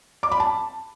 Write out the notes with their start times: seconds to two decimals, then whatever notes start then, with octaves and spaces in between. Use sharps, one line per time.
0.23 D6
0.31 B5
0.40 A5